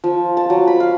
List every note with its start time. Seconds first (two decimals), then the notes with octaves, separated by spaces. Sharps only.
0.04 F3
0.37 A5
0.50 F#3
0.67 B5
0.80 F5